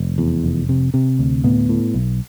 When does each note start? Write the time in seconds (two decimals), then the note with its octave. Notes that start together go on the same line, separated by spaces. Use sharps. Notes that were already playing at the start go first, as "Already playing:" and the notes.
Already playing: F1
0.18 E2
0.44 F1
0.69 C3
0.94 C3
1.19 D2
1.44 A2 B3
1.69 A2
1.94 B1